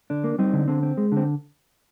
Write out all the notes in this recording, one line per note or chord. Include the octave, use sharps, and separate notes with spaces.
D3 D4
A#3
G3 C4 D#4
D3
D3 C4
C4
G#3
D3 C4